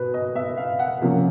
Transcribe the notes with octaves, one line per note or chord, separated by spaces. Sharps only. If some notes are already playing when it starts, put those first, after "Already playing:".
Already playing: B2 B4
D#5
E5
F5
F#5
C3 F3 A#3 C#4